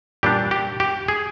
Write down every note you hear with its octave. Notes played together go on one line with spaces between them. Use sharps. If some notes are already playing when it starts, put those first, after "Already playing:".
A#2 G3 D4 G4
G4
G4
G#4